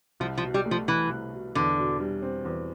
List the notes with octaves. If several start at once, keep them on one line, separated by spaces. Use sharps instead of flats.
C2 F3
F3
B2
G3
A3
F3
E3 E4
C2
B2
E2 D3
B2
G3
C4
E2